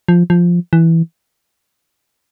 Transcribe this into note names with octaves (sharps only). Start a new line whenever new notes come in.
F3
F3
E3